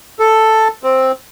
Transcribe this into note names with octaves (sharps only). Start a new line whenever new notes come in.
A4
C4